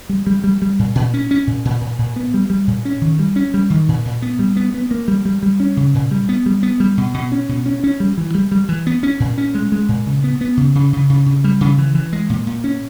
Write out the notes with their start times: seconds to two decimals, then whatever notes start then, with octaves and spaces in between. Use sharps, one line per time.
0.09 G3
0.27 G3
0.44 G3
0.62 G3
0.79 A#2
0.95 A#2
1.14 C#4
1.31 C#4
1.47 A#2
1.65 A#2
1.81 A#2
1.98 A#2
2.16 B3
2.34 G3
2.50 G3
2.67 A#2
2.85 C#4
3.01 D#3
3.19 G3
3.36 C#4
3.54 G3
3.70 D#3
3.88 A#2
4.05 A#2
4.22 B3
4.39 G3
4.57 B3
4.74 B3
4.91 A#3
5.08 G3
5.25 G3
5.43 G3
5.60 C#4
5.77 C#3
5.94 A#2
6.11 G3
6.29 B3
6.46 G3
6.63 B3
6.80 G3
6.97 B2
7.14 B2
7.32 C#4
7.49 B2
7.66 C#4
7.84 C#4
8.00 G3
8.17 E3
8.35 G3
8.51 G3
8.69 E3
8.87 B3
9.03 C#4
9.20 A#2
9.38 C#4
9.54 G#3
9.72 G#3
9.89 A#2
10.06 C#3
10.24 B3
10.41 B3
10.57 C#3
10.75 C#3
10.93 C#3
11.10 C#3
11.26 C#3
11.44 G3
11.61 C#3
11.78 E3
11.95 E3
12.13 G#3
12.30 A#2
12.47 A#2
12.64 C#4